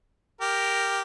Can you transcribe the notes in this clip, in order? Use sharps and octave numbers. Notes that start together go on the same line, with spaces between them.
G4 A#4